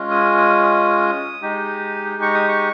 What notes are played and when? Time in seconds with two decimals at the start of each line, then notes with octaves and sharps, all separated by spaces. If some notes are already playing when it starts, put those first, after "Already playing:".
Already playing: G#3 C#4 F4
0.11 D#6
0.38 D#6
0.63 D#6
1.42 G#3 D#4 G4
2.22 C#6
2.34 D#6
2.48 C#6